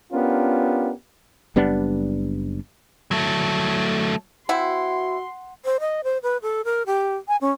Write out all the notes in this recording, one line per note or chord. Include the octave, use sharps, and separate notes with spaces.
B3 C#4 D4 F4 G4 A#4
F#1 G3 B3 D4
F#3 A3
C4 E4 F#4 F#5 C6
C5
D#5
C5
B4
A4
A#4
G4
G#5
C#4